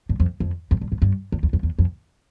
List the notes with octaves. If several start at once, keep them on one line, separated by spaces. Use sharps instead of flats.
G2
F2
F2
F2
G2
G#2
G2
E2
E2
F2
E2
F2